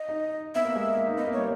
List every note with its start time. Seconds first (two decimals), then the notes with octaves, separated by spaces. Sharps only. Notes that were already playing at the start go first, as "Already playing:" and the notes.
Already playing: D#5
0.09 D#4
0.55 B3 E5
0.65 A#3
0.76 G#3
0.97 A#3
1.06 D#4
1.17 B3 D#5
1.27 A#3
1.33 G3 C#5